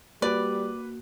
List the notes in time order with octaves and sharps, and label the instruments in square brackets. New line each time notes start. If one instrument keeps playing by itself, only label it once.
[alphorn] G3 [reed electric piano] A#3 F#4 F#6 [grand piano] B4 [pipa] D5